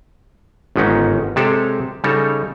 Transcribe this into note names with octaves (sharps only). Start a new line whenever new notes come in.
G1 G#2 D#3 B3 C#4 D#4
C3 G#3 G4 A4 C5 C#5
C#3 G3 D#4 A4 C#5